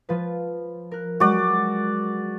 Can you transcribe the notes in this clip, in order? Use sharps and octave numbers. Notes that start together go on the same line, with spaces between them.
F3 F4 B4
A#4 F#6
F#3 G#3 F#4 D5